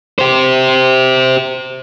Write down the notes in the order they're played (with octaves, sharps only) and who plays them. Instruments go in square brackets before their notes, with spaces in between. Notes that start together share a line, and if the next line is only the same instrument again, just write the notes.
[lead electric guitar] G4 C5